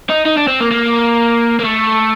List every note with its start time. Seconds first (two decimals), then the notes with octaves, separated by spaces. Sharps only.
0.10 D#4
0.25 D#4
0.37 D4
0.48 C4
0.60 A#3
0.71 A#3
1.60 A#3
1.64 A3